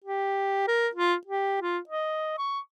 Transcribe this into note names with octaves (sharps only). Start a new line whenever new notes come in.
G4
A#4
F4
G4
F4
D#5
C#6